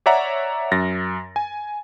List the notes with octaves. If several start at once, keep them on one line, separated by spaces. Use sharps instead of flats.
C#5 D5 E5 F#5 A#5
F#2 A6 A#6
G#5